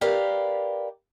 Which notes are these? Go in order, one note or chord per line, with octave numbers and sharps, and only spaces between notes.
G4 A#4 B4 D5 F5